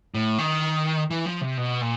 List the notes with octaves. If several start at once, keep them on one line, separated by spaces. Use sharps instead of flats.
A2
D#3
E3
F3
C3
B2
A#2